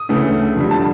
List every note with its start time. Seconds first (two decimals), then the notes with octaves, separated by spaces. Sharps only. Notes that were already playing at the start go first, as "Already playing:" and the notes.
Already playing: D#6
0.09 D2 C#3 E3 A3
0.56 F2 D3 G3
0.71 A5